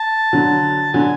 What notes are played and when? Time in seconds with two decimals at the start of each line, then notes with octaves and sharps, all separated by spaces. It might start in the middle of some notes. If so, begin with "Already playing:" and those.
Already playing: A5
0.33 D3 F#3
0.93 D3 F#3 G#5